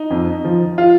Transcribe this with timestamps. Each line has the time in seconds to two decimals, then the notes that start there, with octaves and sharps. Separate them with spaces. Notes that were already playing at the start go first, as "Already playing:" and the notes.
Already playing: D#4
0.10 F2
0.45 F3
0.78 F4